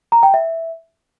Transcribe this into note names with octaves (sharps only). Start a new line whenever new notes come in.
A#5
G5
E5